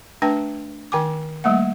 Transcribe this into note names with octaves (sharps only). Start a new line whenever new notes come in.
A3 D4 B4 G5 A5
D#3 G5 G#5 D6
G3 A3 A#3 F#5